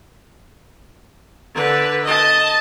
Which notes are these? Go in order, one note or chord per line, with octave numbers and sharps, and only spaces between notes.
D3 B4
D#5 A5